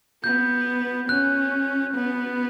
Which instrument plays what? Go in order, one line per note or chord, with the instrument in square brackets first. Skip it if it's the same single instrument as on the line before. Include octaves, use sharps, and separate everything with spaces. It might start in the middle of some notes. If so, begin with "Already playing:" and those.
[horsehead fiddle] B3 [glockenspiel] G6
[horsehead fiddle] C#4 [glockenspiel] F#6
[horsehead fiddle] B3